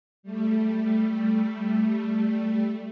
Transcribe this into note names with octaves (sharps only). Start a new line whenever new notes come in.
G3 A3